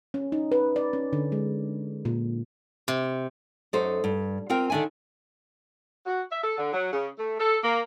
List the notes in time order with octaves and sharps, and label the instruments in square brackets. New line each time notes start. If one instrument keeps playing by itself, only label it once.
[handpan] C#4
D#4
B4
D5
C#4
D3
G#3
A#2
[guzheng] C3
[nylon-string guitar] F#2 D#4 A4 C5
G2
C4 F4 A#4 G5
D3 D#3 D4 E5 G#5
[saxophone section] F#4
E5
A4
D3
F#3
C#3
A3
A4
A#3